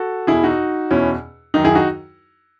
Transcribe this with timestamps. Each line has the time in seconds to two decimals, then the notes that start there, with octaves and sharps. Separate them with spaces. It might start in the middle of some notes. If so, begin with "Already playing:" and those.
Already playing: F#4 A4
0.27 E2 B2 E4 G#4
0.44 D#4 F#4
0.91 E2 B2 C#4 E4
1.54 F#2 D#3 D#4
1.64 E4 G#4
1.75 D#4 F#4